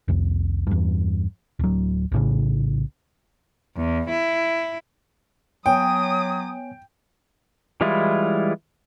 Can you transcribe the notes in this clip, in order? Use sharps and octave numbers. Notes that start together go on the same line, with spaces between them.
C2 F2
E2 G2
D1 F#3
A#1 A2 C#3
E2
E4
F#3 B3 C#5 G5 G#5 D#6
E3 G3 G#3 E4 F4